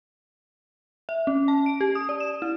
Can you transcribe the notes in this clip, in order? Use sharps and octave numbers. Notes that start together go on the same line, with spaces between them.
E5
C#4
A5
D7
G4
D#6
D5
E7
E4